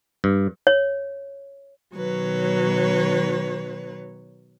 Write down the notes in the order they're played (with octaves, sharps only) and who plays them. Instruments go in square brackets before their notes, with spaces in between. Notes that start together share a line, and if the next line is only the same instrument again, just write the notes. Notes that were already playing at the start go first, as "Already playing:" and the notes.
[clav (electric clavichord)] G2
[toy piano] C#5
[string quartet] B2 D#3 F#3 B4 C#5